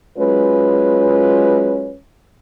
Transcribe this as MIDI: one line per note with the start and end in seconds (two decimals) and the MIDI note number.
0.18 1.94 54
0.18 1.94 56
0.18 1.94 61
0.18 1.94 65
0.18 1.94 71